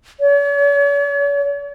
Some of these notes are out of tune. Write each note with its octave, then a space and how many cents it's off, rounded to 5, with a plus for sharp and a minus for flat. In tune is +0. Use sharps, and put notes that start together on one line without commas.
C#5 +45